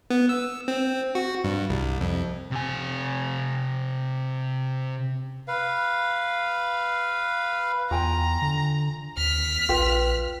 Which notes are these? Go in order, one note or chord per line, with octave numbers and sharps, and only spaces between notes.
B3
E6
C4
F#4
G2
C2
F2
C3 G#5
B4 F5
E2 F4 G5 G#5 A#5
D3
D#2 F6 B6
A#1 F4 B4 G5